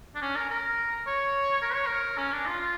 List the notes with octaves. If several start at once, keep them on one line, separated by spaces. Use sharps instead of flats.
D4
C#4
A#4
A#4
C#5
A#4
C#5
A#4
C#4
D4
F4
F4